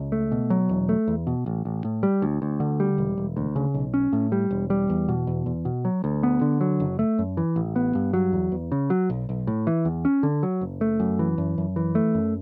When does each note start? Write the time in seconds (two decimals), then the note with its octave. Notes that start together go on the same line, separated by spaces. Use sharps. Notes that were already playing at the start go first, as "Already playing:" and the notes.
Already playing: C#2
0.12 A3
0.32 B2
0.50 F#3
0.69 E1
0.89 A3
1.08 E2
1.27 B2
1.46 A1
1.65 A1
1.85 A2
2.03 G3
2.22 D2
2.42 D2
2.60 D3
2.80 G3
2.98 E1
3.18 E1
3.37 D2
3.56 C#3
3.74 B1
3.94 C#4
4.13 A2
4.32 G3
4.51 E1
4.70 G3
4.90 E2
5.08 B2
5.27 E2
5.46 E2
5.65 B2
5.85 F#3
6.04 D2
6.23 B3
6.41 D3
6.61 F#3
6.80 F#1
6.99 A3
7.19 F#2
7.37 E3
7.56 A1
7.76 B3
7.95 G2
8.13 F#3
8.33 E2
8.52 E2
8.72 C#3
8.90 F#3
9.10 B1
9.29 B1
9.47 A2
9.67 E3
9.85 E2
10.05 C#4
10.23 D3
10.43 F#3
10.61 F#1
10.81 A3
11.00 F#2
11.19 E3
11.38 F#2
11.58 F#2
11.76 E3
11.95 A3
12.15 F#2